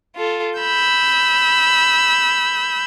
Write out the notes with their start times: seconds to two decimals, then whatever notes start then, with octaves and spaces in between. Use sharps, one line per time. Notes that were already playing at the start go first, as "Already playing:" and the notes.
0.15 F4 A4
0.60 B5 E6 G6